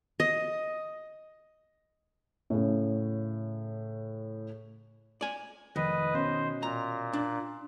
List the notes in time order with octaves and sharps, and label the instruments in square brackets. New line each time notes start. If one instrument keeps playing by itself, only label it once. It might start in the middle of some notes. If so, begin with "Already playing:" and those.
[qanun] D#5
[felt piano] A2 C#3
[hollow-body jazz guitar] D5 G#5
[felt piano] F1 [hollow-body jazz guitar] D#3 [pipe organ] B4 D#5
[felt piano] B2 C#4 D#5 [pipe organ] C5
[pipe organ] A#2 [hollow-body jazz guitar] A#5
[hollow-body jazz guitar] D4